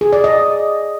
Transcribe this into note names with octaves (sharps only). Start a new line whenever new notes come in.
G#4
D5
D#5